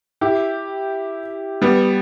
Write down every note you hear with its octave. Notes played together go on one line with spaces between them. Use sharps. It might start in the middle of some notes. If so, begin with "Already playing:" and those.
E4 G4
G3 B3